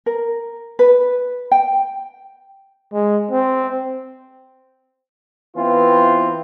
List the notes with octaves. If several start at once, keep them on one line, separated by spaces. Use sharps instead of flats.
A#4
B4
G5
G#3
C4
E3 B3 C4 F4